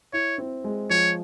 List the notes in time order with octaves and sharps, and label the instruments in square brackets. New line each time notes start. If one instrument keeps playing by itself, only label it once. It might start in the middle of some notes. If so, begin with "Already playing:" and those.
[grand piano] E4 [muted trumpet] C#5
[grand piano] C4
G#3
[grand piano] F3 [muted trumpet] C#5